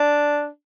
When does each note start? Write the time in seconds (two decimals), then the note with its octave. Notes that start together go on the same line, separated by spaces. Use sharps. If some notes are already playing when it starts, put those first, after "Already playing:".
Already playing: D4